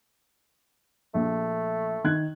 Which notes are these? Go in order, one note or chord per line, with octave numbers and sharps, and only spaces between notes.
A#1 A3
D#3 F#6 G#6